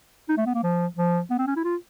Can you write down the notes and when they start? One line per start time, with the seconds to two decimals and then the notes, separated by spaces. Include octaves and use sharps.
0.29 D#4
0.37 A3
0.46 B3
0.54 A#3
0.63 F3
0.96 F3
1.30 B3
1.38 C4
1.47 C#4
1.56 E4
1.64 F4